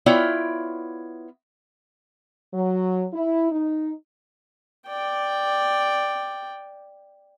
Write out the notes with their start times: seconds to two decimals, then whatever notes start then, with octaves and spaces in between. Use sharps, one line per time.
0.06 B3 E4 F4 C#5 D5 G5
2.54 F#3
3.14 E4
3.52 D#4
4.88 D5 G5